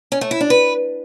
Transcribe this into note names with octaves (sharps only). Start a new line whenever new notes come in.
C#4
A3
E4
D4
B4